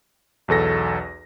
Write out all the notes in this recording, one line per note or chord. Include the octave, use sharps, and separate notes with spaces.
B1 E2 A4 A#6